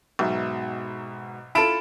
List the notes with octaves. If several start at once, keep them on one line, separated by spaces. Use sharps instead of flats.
B1 G#2 B2 E5
E4 F4 A4 B5 D7 E7